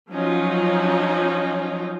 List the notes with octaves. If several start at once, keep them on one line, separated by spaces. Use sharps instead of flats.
F3 F#3 C#4 D#4 F4